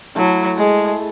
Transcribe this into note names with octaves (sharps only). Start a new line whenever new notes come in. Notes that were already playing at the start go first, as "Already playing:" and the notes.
F#3 A3 E4 A4
G#3